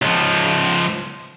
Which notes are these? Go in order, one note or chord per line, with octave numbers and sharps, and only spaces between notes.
C#2 F3